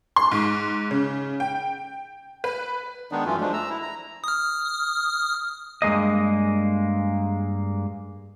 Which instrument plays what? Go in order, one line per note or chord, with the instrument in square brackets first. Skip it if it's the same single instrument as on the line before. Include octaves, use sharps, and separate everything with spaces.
[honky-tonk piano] C6
G#2
C#3
G5
B4
[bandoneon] D#3 G#3 B3 D4 D#4
F#2 E3 F#3 A3 C#4 F4
F3 G#3 A3 D4
A#5 E6
E4
A#5
[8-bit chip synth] D#6 F6
[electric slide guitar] G2 G#3 A#3 D#5